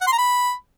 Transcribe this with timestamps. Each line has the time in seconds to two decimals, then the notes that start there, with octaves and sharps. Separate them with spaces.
0.01 F#5
0.07 C6
0.12 A#5
0.18 B5